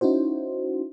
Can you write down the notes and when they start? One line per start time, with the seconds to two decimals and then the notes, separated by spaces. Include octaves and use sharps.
0.01 C#4 D#4 E4 F#4 C5